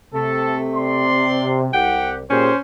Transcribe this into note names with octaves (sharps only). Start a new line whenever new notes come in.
C3 A3 A4
D5 C6
C2 G4 F#5 G5
A#2 C#4 G4 G#4 C5